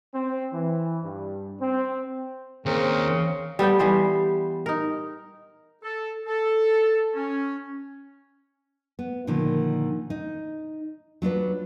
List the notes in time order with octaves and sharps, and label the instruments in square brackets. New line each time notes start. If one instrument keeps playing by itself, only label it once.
[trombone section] C4
E3
G2
C4
[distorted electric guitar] D#2 [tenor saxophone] C#3 [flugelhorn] C4 [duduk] A#4
[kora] G3 B3 A4 G5
E3 G3 B3 C5
D#4 A#4
[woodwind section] A4
A4
C#4
[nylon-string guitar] B3
A#2 D3 D#3 F3
D#4
F#3 D4 F4 B4